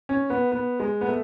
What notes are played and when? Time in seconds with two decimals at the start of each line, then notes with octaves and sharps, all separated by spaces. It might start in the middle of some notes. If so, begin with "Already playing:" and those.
0.09 C#4
0.30 B3
0.52 B3
0.80 G#3
1.01 B3
1.08 A3